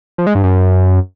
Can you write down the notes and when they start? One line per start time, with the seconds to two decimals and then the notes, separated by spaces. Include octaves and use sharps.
0.18 F3
0.27 G#3
0.35 G2
0.44 F#2